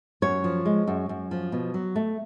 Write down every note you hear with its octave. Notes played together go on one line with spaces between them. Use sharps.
F#2 C#5
F3
G#3
F#2
F#2
F3
B2
F#3
A3